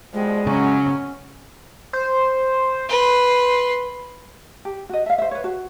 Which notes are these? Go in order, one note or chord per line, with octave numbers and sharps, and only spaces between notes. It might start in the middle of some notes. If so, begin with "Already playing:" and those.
B2 F3 G3 G#3
C#3 F#3 C#4
C5
B4 C6
G4
F#4 D#5
E5 F5
C5 E5
B4 C#5
F#4